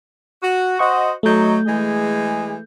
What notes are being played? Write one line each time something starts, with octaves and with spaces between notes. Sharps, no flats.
F#4
F#4 C5 D#5 F#5 C#6
F#3 A3 D#4 G6
E3 G#3 G#4